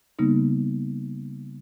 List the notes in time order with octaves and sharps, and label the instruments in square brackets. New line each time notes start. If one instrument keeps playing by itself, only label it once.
[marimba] C#3 G3 A#3 B3 D#4